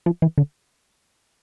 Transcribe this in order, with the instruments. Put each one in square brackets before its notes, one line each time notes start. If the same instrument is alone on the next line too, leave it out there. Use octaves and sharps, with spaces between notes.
[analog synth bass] F3
E3
D3